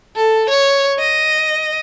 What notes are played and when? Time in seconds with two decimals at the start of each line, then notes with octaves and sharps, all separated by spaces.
0.16 A4
0.49 C#5
0.99 D#5